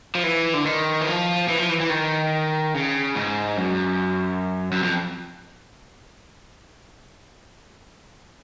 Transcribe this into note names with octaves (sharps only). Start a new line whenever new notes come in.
F3
E3
D3
D#3
E3
F3
E3
F3
E3
E3
D#3
C#3
G#2
F#2
F#2
F2